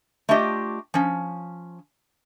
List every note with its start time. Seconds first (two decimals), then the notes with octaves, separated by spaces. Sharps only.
0.29 A3 D4 F4 G4 D#5
0.94 F3 C#4